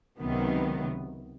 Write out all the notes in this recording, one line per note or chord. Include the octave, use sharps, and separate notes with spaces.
C#2 C3 D#3 F#3 B3